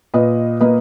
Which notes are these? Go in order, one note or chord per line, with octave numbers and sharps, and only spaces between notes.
A#2 B4 D#5
A#3 B4 D#5